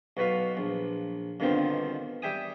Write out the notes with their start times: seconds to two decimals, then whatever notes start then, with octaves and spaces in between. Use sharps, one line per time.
0.17 B1 B2 F#4 B4 F5
0.57 A#1
1.40 G2 B2 D3 D#3 C4 F4
2.22 G3 E5 G5 G#5 D#6